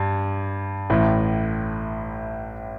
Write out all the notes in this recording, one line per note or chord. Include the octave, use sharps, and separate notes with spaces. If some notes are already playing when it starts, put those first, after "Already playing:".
Already playing: G2
A1 A2